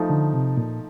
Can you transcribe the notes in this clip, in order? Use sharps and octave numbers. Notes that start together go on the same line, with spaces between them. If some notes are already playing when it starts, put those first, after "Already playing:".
Already playing: F3 A3 D#4
D3
C3
A#2